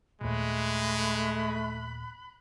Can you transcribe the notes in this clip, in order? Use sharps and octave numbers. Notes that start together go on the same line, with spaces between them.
D#2 A#2 G#3 A3 B5 F#6